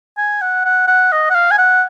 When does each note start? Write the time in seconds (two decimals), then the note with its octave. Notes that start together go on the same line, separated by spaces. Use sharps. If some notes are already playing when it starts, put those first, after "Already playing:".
0.17 G#5
0.42 F#5
0.65 F#5
0.88 F#5
1.12 D#5
1.30 F#5
1.35 F5
1.51 G#5
1.58 F#5